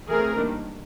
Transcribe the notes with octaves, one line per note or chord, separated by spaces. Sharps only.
E3 A3 C4 G#4 A#4
D#3 G3 A#3 D4